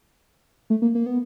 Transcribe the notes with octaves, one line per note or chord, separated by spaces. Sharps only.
A3
A#3
A#3
B3